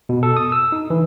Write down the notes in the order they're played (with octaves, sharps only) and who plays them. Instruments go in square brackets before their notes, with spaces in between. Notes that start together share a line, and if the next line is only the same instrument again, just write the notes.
[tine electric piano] B2
A4
D#6
E6
D#4
E3